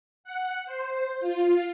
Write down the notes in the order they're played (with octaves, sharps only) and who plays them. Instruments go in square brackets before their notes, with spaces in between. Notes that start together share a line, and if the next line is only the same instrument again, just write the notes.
[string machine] F#5
C5
F4